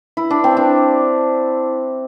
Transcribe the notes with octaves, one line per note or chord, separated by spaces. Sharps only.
E4
D4
C4
D4